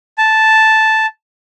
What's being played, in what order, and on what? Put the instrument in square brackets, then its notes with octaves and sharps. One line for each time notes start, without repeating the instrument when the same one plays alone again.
[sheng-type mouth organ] A5